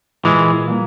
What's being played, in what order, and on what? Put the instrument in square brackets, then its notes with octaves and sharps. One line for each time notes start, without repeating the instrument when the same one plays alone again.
[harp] A#2 [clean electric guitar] E3 G#3
[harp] G3 A#3